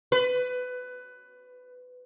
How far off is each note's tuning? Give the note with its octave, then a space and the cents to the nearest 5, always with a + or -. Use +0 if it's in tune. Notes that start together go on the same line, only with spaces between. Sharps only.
B4 +20